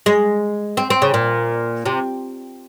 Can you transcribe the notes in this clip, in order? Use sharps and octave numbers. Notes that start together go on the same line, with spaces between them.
G#3
C4
C4
C#3
A#2
C3